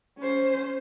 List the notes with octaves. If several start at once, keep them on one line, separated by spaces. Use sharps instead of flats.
C#4 C5